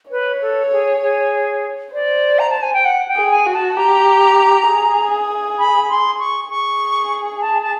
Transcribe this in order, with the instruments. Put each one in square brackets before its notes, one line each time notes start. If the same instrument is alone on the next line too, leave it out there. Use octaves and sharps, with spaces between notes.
[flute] B4 [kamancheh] C#5
[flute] A4
G#4
G#4
[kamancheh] C5 [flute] D5
[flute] A#5
A5
G#5
G5
F#5
G5
[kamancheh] G#4
[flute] G#5
[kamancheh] F#4
[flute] A5
[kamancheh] G4 [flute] A#5
[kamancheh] G#4
[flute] B5
C6
C#6
[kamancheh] G#4 [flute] C#6
[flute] A5
A5